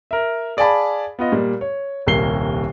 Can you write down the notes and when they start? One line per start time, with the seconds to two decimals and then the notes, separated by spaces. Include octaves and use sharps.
0.11 A#4 E5
0.57 G#4 D5 F5 G#5 A5 B5
1.19 B3 F4 D#5
1.32 A#2 G3
1.61 C#5
2.07 D#1 C2 A#3 C7 G7